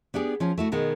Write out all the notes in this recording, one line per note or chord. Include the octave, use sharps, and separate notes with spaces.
B3 D4 G4 G#4
F3 C#4
A3 E4 F#4
B2 D#3 G#3 B3